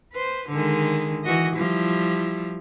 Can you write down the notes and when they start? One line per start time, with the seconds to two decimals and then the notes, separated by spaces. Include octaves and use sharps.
0.12 B4 C5
0.49 D3 D#3 G#3
1.24 E3 F#4 D#5
1.56 F3 G3 E4